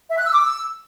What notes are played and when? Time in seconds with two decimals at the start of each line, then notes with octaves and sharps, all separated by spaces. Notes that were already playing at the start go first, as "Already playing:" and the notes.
0.11 E5
0.18 F#6
0.25 E6
0.33 D6
0.40 E6